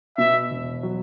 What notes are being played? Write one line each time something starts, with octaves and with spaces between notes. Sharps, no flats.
B2 E5
E1
F#3